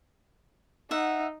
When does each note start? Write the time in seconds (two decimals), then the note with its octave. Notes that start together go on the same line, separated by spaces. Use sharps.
0.91 D#4 E5 F#5